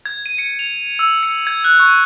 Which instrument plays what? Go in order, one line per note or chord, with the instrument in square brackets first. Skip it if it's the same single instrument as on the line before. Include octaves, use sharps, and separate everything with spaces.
[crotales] G#6
D#7
C#7
F7
E6
C#7
G#6
F#6
C#6